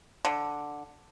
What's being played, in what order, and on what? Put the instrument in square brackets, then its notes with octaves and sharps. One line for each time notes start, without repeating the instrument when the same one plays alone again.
[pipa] D3